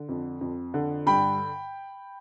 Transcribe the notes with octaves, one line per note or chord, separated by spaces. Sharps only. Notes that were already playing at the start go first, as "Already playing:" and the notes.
Already playing: D3
F2
F2
D3
G2 G5 B5